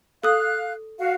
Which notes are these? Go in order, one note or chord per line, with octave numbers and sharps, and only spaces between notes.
A4 F5 D#6 F#6
F#4 F5